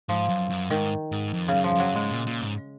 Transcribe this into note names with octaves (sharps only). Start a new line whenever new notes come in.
G#2 F3
F#2
F#2
G#2 D#3
G#2
F2
C#3
F#2
F3
F#2 F#3
G#2 G#3
A#2
A#2
G#2